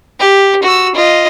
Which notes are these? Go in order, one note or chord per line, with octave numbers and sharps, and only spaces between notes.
G4
F#4 E6
F4 D#5